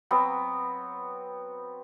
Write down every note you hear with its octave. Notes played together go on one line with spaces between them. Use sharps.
F#3 B3 C4